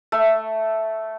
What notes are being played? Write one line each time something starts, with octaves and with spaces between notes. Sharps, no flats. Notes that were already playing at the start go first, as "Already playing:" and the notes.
A3